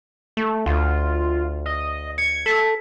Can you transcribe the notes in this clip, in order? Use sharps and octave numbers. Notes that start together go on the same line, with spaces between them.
A3
D2 F4
D#5
G#6 C#7
A4 B6